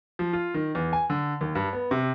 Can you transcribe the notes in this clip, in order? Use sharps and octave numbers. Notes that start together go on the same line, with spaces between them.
F3
F4
D#3
E2
G#5
D3
D#2
G2
B3
C3